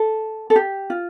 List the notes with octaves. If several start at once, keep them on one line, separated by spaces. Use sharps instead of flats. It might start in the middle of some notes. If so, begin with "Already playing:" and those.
Already playing: A4
A4
G4
F4